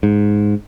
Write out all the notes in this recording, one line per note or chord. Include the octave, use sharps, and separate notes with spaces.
G#2